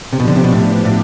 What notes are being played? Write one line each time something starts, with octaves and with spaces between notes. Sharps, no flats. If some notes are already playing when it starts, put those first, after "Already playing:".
C3
B2 F3 B3 D4 G4
D3
C3
B2
A2
A2